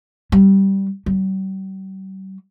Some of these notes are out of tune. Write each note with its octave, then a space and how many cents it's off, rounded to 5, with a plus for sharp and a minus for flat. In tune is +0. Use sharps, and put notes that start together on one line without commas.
G3 -10
G3 -40